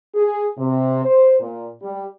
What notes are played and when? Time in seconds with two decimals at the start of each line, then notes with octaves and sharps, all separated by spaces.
0.15 G#4
0.58 C3
1.05 C5
1.40 A#2
1.82 G3